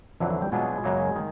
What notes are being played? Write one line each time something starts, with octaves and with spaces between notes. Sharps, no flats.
F2 D3 E3 F#3
E3
G3
B2 F#3 G#3 B3 D4 F4
F#2 C#3 F#3 A#3
D#3